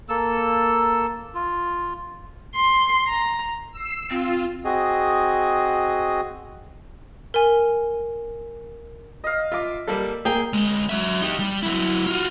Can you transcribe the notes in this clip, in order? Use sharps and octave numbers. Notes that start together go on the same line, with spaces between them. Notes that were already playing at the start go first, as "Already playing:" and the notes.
A#3 A4 E6
F4
C6
A#5
E6 C7
C4 F4
C4 F#4 G#4 D#5
A#4 G#5
D#5 F5
F4 E5 D6
G3 A#3 A4
A#3 G#4 G5
D2 G#3
F#3 E5
D#4 G4
G3
F#3 E4
F4 F#4